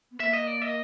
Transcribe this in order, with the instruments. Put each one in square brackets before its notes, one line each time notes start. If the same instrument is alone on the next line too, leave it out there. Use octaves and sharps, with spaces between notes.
[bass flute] B3
[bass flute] A#3 [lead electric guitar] E5
[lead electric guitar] D#5
D5
D#5